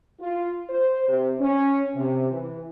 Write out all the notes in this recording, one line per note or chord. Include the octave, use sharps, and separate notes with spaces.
F4
C5
C3
C#4
C3
E3